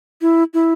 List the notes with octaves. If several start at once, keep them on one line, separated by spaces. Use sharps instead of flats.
E4
E4